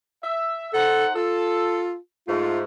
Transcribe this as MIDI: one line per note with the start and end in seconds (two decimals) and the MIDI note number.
0.22 0.68 76
0.73 1.12 63
0.73 1.06 69
0.73 1.12 72
0.73 1.12 78
1.14 1.97 65
1.14 1.89 69
2.27 2.62 44
2.27 2.62 57
2.27 2.60 65